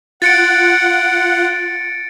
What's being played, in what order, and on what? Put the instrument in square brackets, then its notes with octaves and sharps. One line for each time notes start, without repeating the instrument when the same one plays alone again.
[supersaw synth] F4 [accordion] F#5 [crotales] A6 C#7 D7